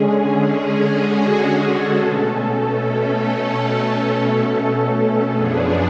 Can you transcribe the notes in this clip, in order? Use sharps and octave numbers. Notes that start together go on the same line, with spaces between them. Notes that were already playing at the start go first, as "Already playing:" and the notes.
Already playing: D3 G#3 C#4 G#4
F#4
F#4
A4
B2 A3 C#4 A4
F#2 F3 B3 D4 G#4